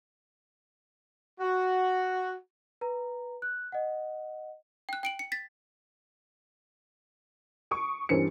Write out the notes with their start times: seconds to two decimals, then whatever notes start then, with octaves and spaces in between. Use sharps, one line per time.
1.40 F#4
2.81 B4 A#5
3.42 F#6
3.72 D#5 F#5
4.89 G5 F#6
5.03 G5 D7 F#7
5.19 C#7
5.32 A6 B6
7.71 C#6 D#6 D7
8.09 G2 E3 C4 C#4 A#4 C#7